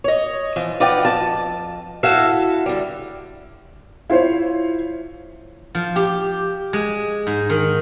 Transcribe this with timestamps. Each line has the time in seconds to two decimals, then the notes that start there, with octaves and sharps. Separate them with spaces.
0.04 C#5 D#5
0.56 E3 F3
0.80 F4 B4 D5 D#5 F#5 G5
1.05 F2 A5
2.03 E4 F#4 A4 E5 F5
2.66 D3 G3
4.10 E4 F4 C5 C#5
5.75 F3
5.96 G4
6.73 G#3
7.27 G#2
7.50 D#3